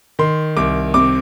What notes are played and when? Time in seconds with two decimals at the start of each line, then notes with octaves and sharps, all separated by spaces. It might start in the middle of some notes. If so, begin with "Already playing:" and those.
0.19 D#3 C6
0.57 C2 D6
0.94 C3 D6